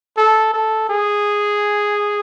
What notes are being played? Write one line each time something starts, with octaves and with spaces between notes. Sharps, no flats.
A4
A4
G#4